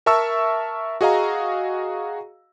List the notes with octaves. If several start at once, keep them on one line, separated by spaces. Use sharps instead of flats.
A#4 E5 A5 C#6 E6
F#4 G#4 D#5 F5 A#5